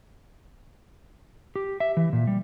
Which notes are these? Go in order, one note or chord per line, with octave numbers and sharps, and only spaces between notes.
G4
E5
E3
A#2
G3